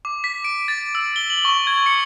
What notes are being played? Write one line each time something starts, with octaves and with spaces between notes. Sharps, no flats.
D6
B6
D7
A6
E6
G7
F#7
C#6
G#6
C#7